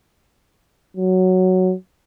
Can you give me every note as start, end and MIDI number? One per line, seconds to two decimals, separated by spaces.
0.97 1.74 54